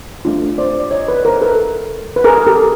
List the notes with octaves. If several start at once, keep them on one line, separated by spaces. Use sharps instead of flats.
A3 D4 F4
C5 D5
D5
C#5 D#5
B4 C#5
A#4 C5
A#4
A4 B4
B4
G#4 A#4
A#4
G4 A4